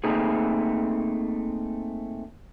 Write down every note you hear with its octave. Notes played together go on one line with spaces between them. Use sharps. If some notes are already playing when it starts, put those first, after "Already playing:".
A3 A#3 C4 D#4 G#4